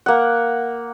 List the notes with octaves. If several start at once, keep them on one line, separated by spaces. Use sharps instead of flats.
A#3 F#5